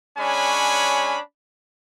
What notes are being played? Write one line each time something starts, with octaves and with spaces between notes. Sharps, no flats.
G#3 C#4 D4 C#5 G#5 B5